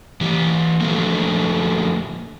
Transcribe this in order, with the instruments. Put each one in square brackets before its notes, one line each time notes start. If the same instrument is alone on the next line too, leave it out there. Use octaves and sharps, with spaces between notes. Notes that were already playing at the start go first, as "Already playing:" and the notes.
[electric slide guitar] E3 G4
D3 F3 A3 A#3